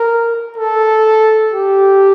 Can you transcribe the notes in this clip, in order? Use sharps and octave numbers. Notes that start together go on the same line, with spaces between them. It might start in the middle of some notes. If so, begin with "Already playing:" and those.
Already playing: A#4
A4
G4